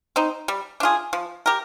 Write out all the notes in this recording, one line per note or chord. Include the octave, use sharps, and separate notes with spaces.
C4 D#4
G3
D4 F4 G#4
F3
G4 A#4